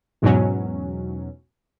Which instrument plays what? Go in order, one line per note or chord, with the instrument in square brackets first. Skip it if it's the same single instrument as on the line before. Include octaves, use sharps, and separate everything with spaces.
[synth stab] E2 G#2 B2 F#3 C#4